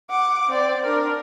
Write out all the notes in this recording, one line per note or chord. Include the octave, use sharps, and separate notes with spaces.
F#5 D6
C4 D5
D4 A#4